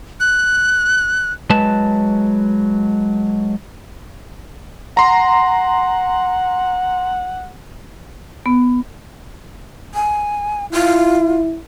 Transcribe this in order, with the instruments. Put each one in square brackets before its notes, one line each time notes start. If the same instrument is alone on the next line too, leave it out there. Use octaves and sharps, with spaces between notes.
[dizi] F#6
[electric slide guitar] F#3 G#3 B4 A5
[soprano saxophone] F#5 [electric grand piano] A#5 C6
[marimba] B3
[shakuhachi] G#5
[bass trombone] E4 [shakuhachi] F4